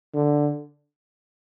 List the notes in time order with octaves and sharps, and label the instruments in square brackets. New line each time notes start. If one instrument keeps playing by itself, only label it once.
[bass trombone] D3